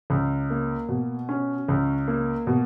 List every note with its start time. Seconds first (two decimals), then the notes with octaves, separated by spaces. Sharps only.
0.10 C#2
0.50 A#3
0.89 B2
1.29 C#4
1.68 C#2
2.08 A#3
2.47 B2